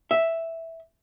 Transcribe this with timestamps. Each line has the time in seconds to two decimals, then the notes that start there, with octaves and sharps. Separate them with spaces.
0.11 E5